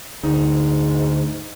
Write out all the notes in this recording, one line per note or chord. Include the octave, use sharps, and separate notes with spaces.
D2 G#2 D#4